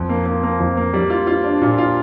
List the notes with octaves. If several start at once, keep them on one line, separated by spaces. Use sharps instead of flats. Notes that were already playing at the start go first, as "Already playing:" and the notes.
Already playing: F2
A#3
A#3
A#3
F2
A#3
G3
F4
F4
D4
A#2
F4